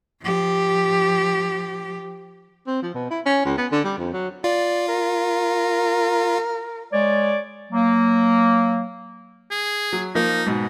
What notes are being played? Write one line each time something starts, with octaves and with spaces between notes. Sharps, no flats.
F3 G4
C4
F3
B2
E4
C#4
C#2
B3
D3
G3
F2
F#3
F4 D5
A#4
G#3 C#5 D5
F#3 A#3
G#4
F#3
F3 A#3 D#4
G#2 B2